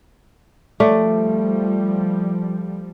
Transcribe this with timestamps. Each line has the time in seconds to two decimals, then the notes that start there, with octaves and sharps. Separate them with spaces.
0.80 F3 G3 A3 D5